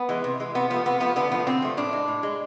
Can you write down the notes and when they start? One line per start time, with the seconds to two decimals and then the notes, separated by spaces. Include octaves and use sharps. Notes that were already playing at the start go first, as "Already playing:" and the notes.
Already playing: B3
0.09 E3 G#3
0.24 C3
0.40 E3 G#3
0.55 C3 B3
0.70 F3 A3 B3
0.85 C3 B3
1.00 F3 A3 B3
1.16 D3 B3
1.32 F3 A3 B3
1.47 D3 C4
1.62 F3 A3
1.77 A2 D4
1.93 G#3
2.08 A2
2.23 G#3